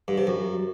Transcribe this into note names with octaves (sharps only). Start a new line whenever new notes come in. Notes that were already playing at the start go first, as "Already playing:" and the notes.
G2
C3
F#2